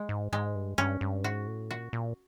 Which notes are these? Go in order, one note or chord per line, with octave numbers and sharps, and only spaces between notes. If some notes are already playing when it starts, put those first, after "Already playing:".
Already playing: G#3
G#2
G#2 G#3
G2
G2 C#4
G2
G#2 F#4
A2
A#2 F#4
A#2